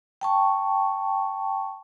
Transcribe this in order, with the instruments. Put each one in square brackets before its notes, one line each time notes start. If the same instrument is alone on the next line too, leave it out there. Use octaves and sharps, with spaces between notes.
[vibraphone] G5 A5 C#6